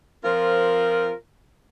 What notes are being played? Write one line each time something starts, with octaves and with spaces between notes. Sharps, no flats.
F3 C4 F4 A#4